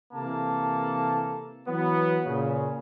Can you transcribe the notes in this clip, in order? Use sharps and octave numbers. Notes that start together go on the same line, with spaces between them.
C3 E3 A#3 A4 A5
E3 F#3 B3
A#2 C#3